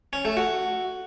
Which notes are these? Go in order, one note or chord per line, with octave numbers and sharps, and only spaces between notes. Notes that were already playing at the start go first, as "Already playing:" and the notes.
C#4
A3
F#4